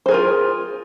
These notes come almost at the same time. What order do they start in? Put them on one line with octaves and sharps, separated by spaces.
C5 G#4 A#4 F4